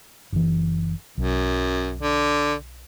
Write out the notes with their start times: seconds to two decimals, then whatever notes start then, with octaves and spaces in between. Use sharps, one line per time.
0.33 F#1 E3
1.17 B1 F#2
2.01 D3